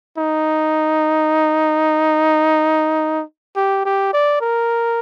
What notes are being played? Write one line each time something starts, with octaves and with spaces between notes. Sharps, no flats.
D#4
G4
G4
D5
A#4